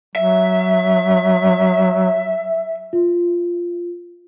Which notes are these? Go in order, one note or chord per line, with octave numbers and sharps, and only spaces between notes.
F#3 E5
F4